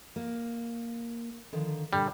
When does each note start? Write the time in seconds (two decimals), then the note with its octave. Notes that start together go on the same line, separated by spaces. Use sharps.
0.16 A#3
1.53 D3 D#3 F3
1.93 A#2 D3 G3 D4